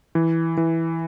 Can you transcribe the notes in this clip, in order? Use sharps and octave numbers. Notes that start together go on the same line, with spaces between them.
E3
E3